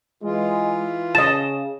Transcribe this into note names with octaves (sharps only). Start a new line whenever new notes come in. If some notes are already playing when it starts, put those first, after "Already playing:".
E3 G#3 F4
C#3 D#5 A5 E7